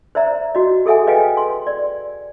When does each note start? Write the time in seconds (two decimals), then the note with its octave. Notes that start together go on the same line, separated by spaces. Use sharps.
0.15 C5 D5 E5 A#5
0.55 F#4 D#5
0.86 G#4 A4 E5 F#5 G#5
1.07 B4 D#5 F5 G5 G#5
1.37 C6
1.67 D5